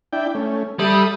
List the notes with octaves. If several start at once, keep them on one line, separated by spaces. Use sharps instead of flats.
D4 E4 G5
A3 C#4
G3 A4 E5 D#6